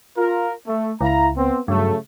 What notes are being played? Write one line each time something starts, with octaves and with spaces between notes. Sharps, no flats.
F4 A#4
A3
C#2 E4 F5 A#5
B3 C4
G2 C#3 F#3 A3